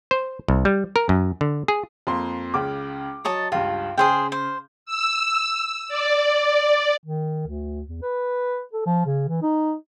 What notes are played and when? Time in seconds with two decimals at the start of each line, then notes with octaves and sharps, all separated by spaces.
0.11 C5
0.48 C2
0.65 G3
0.96 A#4
1.09 F#2
1.41 D3
1.68 G#4
2.07 F2 A#3 C6
2.54 C#2 C#3 D6
3.25 F#3 C#5 D#5 A5
3.52 C#2 G2 F4
3.98 C#3 G#4 C5 G5
4.32 C5
4.86 E6
5.88 D5
7.06 D#3
7.47 D2
7.88 E2
8.02 B4
8.73 A4
8.86 F3
9.06 C#3
9.28 E3
9.42 D#4